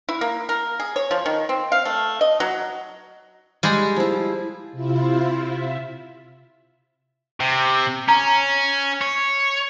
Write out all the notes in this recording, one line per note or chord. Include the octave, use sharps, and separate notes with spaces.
E4
A#3
A#4
G#4
C#5
F3
D#3
C4
F5
A3
D#5
F#3
G3 G#3
F3 E4
C3 E4 F4
E5
C3
C#4 A#5
C#5